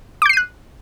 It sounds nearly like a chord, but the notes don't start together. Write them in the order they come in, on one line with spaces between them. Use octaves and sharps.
D6 G6 C7 D#7 F#6